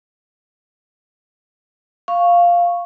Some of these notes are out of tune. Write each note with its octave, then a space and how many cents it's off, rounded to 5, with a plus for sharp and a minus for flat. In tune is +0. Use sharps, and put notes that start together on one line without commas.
F5 +0 C#6 -5